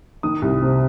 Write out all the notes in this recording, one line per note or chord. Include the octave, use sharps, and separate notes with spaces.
D#3 D#6
C2
C3